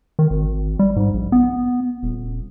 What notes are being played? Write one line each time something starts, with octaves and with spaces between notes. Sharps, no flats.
D#3
G#1
G3
G#2
A#1
B3
D#1